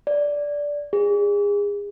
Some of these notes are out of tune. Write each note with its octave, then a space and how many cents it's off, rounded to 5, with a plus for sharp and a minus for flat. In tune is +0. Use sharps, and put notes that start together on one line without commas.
D5 -10
G#4 -30